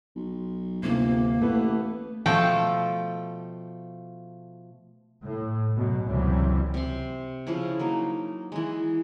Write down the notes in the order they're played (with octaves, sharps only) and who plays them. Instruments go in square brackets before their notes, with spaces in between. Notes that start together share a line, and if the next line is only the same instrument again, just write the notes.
[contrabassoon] B1
[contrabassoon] G1 [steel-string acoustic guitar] D2 C3 [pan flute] A#3
[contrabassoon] A1 [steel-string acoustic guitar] A3 B3 B4
[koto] B2 F3 A3 A4 G5
[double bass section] A2
F#2 B2 F#3
C#2 F#2 C3 E3 F#3 G3
[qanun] C3 C6
C#3 F3 E4
F#3 A#3 D#4
E3 G#3